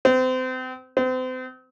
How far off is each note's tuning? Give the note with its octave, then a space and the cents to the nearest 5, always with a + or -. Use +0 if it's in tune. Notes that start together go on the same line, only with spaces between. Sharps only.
C4 -30
C4 -35